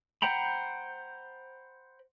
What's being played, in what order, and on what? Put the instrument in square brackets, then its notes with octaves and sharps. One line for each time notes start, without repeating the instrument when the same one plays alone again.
[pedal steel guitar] C5 F#5 G5 A#5 B5